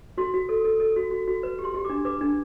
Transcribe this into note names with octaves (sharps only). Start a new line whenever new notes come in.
F#4 C6
F#4
A4
A4
A4
F#4
F#4
F#4
B4
G4
C6
G4
D6
D4
B4 D6
D4